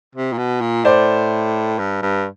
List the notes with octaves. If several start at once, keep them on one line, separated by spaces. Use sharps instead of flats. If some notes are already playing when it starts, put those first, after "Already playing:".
C3
A#2
B2
A#2
A2 C5 D5
G2
G2